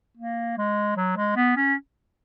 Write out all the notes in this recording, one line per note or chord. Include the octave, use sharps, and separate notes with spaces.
A#3
G#3
F#3
G#3
B3
C#4